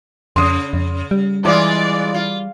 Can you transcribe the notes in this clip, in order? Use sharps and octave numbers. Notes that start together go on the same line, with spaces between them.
F2 C#3 C6 D#6
F2
G3
E3 G#3 F4 D5 D6
F4